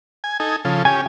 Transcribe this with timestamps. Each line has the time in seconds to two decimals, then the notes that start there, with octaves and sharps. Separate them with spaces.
0.24 G#5
0.40 D#4 A4 G#5
0.65 C#3 F3 A4
0.85 C#4 G4 G#5